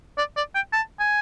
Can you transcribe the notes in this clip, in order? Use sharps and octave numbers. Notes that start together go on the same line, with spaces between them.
D5
D5
G5
A5
G#5